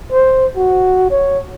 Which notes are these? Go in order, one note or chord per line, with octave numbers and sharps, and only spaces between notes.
C5
F#4
C#5